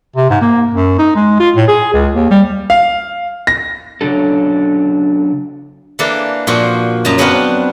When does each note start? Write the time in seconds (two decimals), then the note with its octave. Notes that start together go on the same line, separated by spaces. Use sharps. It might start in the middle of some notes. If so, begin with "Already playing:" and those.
0.16 C3
0.30 G#2
0.42 A#3
0.74 F#2
0.99 D#4
1.16 G#3
1.40 F4
1.56 A2
1.68 G#4
1.94 C#2
2.15 D#2
2.31 G3
2.70 F5
3.47 A#6
4.01 C#3 F#3 D4 A4
5.99 E3 A#3 D4 A4
6.47 A#2 F3 F#4 C5
7.05 F#2 D#5 A5 A#5
7.18 F#3 B3 C4 D4 F4 F#4